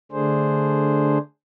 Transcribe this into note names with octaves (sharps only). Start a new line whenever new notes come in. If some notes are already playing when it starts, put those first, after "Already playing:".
D3 A3 D4 G#4 C5